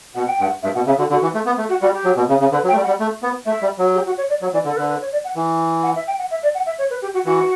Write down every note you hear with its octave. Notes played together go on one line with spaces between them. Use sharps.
B2 F#5
G5
G2
F#5
G2 E5
B2 F#5
C#3 E5
D3 F#4
D3 F#4
E3
A3
B3
A3
F#4
G3 F#4
G4
F#3
B2
C#3
C#3
D3 B4
F#3
G5
A3
G3
F#5
G3
A3
B3
A3 E5
G3
F#3
G4
F#4
C#5
D5
F#3 C#5
E3 D5
D3 A4
D3 B4
B4
C#5
D5
F#5
E3
F#5
E5
G5
F#5
E5
D5
F#5
E5
C#5
B4
G4
F#4
E3 F#4